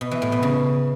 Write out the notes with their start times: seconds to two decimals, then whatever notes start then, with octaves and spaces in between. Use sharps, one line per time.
0.01 B2
0.11 E3
0.22 A2
0.32 B2
0.43 C#3